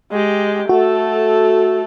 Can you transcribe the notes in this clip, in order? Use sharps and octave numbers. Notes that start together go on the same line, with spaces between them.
G#3 G4
A3 F#4 A4